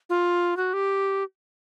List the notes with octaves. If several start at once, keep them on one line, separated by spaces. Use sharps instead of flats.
F4
F#4
G4